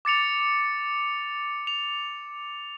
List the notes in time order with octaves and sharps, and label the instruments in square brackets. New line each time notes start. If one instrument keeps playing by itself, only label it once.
[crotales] D6 A6 C#7 F7
F7